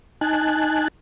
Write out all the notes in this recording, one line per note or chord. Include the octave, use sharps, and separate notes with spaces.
D#4 G#5 A5 F#6